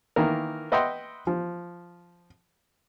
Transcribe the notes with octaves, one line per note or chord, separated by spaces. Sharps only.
D#3 E3 A#3 A#4
B4 D#5 E5 F#5 G5 C6
F3